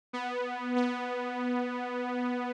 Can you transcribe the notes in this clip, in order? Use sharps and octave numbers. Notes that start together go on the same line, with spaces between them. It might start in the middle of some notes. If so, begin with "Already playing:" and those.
B3
B3